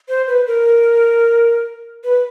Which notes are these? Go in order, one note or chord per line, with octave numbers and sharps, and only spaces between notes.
C5
B4
A#4
B4